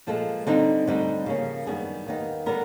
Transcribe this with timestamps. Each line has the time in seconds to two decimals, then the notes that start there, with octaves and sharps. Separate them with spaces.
0.07 A#2 F3 G#3 A4
0.47 D3 G3 C4 D#4
0.87 D2 D3 G3 C4 D#4
1.26 C#3 F3 A#3 C#4
1.66 F#2 D#3 G3 B3 D4 G#4
2.06 D#2 D#3 G3 B3 D#4
2.46 D3 G3 B3 A#4